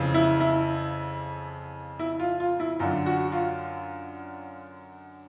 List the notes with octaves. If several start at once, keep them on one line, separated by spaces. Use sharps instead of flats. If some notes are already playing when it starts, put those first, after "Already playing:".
Already playing: F2 C#3 E3
E4
E4
E4
F4
F4
E4
F#2 D3 F4
F#4
F4